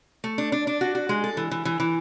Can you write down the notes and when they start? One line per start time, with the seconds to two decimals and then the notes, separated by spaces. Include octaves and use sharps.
0.24 A3
0.38 D4
0.52 D4
0.67 D4
0.81 F#4
0.95 F#4
1.09 G#3
1.24 A4
1.37 E3
1.51 E3
1.65 E3
1.80 E3